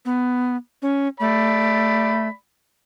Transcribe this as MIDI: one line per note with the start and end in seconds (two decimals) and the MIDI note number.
0.05 0.56 59
0.82 1.08 61
1.20 2.28 57
1.20 2.34 74
1.20 2.34 83